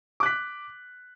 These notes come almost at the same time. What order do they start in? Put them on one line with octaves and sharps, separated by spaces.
D6 F#6 B6